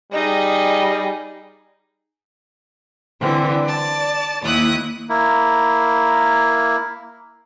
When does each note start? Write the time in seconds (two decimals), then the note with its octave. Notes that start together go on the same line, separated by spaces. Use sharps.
0.13 G3 D#4 G#4 D#5
3.20 D3 E3 G3 C4
3.63 D5 A5
4.42 D#2 D#3 A#3 E4 D#6 F#6
5.09 A#3 E4